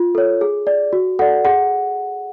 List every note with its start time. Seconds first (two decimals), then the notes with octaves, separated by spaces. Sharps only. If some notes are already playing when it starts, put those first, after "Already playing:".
Already playing: F4
0.15 A4 C#5
0.41 G#4
0.67 D5
0.93 F#4
1.19 A4 D5 F#5
1.45 G#4 F#5